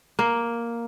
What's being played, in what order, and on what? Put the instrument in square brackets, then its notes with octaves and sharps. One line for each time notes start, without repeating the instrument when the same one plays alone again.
[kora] A#3